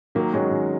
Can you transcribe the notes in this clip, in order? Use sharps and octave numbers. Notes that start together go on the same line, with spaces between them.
D#3 F#3 A#3
F#3 G#3 C#4 F#4
D#3